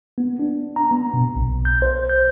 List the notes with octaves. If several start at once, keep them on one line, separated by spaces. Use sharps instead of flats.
B3
D4
A#5
B3
B2
B1
G6
C5
G6